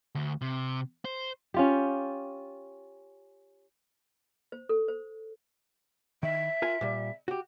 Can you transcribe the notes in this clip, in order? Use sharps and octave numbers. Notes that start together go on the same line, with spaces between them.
D2
C3
C5
C#4 F4 G4
C5
A4
C5
D#3 E5
F4 A#4 G#5
A#2 G3
F#4 G4